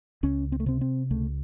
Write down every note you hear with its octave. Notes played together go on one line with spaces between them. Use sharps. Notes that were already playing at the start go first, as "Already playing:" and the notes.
C#2 C#4
C4
A3
C3 C4
C4
C#2 A3